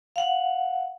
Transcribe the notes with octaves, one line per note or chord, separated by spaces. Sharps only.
F5 F#5